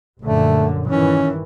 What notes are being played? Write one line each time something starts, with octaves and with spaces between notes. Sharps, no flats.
A#1 F#2 D3 A3
G2 D#3 E3 C#4